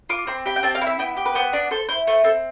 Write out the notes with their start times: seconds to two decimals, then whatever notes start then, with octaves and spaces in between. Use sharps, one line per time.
0.09 F4 D6
0.27 C4 C6
0.46 G4 B5
0.56 G5
0.63 C4 A5
0.75 F5
0.81 E4
0.87 E5
0.99 B3 G5
1.17 G4
1.25 B4
1.35 B3 C5
1.53 D4 D5
1.71 A4 C5
1.89 E4 C5
2.07 A3 C5
2.24 C4 A4